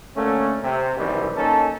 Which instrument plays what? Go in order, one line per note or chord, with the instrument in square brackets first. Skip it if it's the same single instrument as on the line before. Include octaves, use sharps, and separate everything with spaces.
[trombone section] D2 D3 A3 A#3 C#4
C3
C2 F#2 B2 D#3 E3 G3
A#3 C#4 D#4 A4